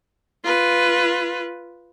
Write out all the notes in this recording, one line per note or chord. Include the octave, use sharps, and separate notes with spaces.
F4 B4